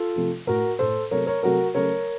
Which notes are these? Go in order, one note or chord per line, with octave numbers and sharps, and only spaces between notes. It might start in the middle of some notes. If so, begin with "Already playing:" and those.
Already playing: F4 A4
C3 F3 A3
A2 A3 F#4 A#4
A2 A3 A4 C5
C3 F#3 A3 A#4 C#5
A#4 C#5
C3 F#3 A3 F#4 A#4
C#3 F#3 A3 A#4 C#5